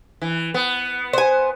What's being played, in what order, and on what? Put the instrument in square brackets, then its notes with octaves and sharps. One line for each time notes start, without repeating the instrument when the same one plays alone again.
[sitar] E3
B3
[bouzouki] C5 G#5